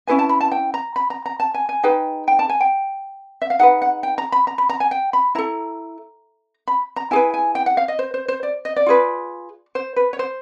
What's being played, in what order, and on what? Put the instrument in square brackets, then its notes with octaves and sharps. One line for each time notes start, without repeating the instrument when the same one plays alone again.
[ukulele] C#4 E4 G#4 B4 G#5
A5
B5
A5
G5
A#5
B5
A#5
A#5
A5
G#5
G#5
D#4 G#4 B4 G5
G5
A5
G#5
G5
E5
F5
D#4 G#4 B4 F#5
F#5
G5
A#5
B5
A#5
B5
A#5
G#5
G5
B5
E4 A4 A#5
B5
A#5
E4 G#4 B4 G#5
G#5
G5
F#5
F5
D#5
C5
C5
C5
D5
D#5
D5
F4 G#4 B4
C5
B4
C#5
C5